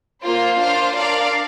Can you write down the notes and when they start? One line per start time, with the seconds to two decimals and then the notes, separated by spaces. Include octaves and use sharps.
0.22 A#3 F4 C5
0.58 D4 F4 C5 F5
0.94 D4 A#4 D5 F5